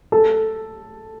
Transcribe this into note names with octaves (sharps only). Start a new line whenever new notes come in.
A4